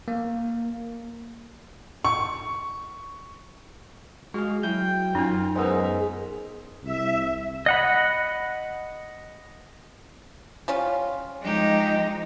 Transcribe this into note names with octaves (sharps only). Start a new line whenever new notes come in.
A#3
C#6
G#3 F#4 G#4 F5
F#3 E4 G5 G6
F#2 C#4 D#4 F4
G#3 B3 D#4 A#4 C5 E5
C2 E5
D#5 F#5 B5
G3 C#4 F4
F3 G#3 D#4 G4